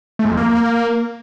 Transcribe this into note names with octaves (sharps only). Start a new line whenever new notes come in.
A3
G#2
F2
A#3